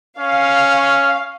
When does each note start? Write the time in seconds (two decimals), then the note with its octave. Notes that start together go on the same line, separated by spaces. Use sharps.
0.19 C#4 F5